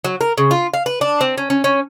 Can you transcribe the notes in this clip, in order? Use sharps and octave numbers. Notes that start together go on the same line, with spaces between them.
F#3
A#4
C#3
F4
F5
B4
D4
C4
C#4
C#4
C#4